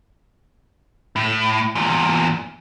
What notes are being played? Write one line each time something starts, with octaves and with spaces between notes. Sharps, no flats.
A2
E2 A#2